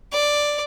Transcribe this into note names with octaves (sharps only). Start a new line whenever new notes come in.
D5